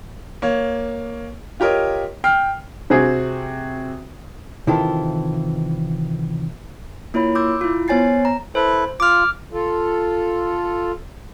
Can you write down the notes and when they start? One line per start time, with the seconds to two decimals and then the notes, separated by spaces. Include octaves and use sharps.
0.42 A#3 C#5
1.60 F4 G4 A#4 C#5 D#5
2.24 G5 F6 C7
2.90 C3 C4 F#4 G#4
4.67 C3 D#3 E3 E4 F4 A4
7.14 A#3 E4 F4 C#5 B5
7.35 C6 D6 E6 G6
7.61 E4 F4
7.88 B3 C5 C#5 G#5 A6 C7
8.25 A#5
8.55 E4 A4 B4 C5
9.00 F4 D6 F6
9.53 F4 A4